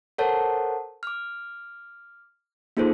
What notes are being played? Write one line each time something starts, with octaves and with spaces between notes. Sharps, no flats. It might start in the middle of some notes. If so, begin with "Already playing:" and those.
A4 A#4 C5 C#5 F#5 A5
D6 F6
A#3 D#4 F4 G#4 A4 C5